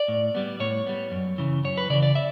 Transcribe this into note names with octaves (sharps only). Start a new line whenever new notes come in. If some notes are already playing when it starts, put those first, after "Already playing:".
Already playing: D5
A2
G3 B3
A2 C#5
G3 B3
F#2
C#3 E3
F#2 C#5
B4
C#3 E3 D5
D5
E5